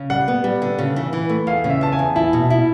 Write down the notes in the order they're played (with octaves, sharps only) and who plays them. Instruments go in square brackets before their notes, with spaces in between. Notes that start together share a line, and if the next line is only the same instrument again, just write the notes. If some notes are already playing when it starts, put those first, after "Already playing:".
Already playing: [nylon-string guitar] C#3
[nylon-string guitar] G3 [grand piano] F#5
[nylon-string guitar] B3
G3
D3
C#3
E3
E3
A3
[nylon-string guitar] E2 [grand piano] F5
[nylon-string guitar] C#3
[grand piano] E5
[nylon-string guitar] E2 [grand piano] A5
[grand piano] G#5
[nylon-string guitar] E2
[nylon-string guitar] E4 [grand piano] A5
[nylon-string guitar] B2
E4